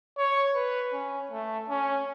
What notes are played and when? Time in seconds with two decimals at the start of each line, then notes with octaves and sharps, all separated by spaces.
0.18 C#5
0.55 B4
0.93 C#4
1.31 A3
1.69 C#4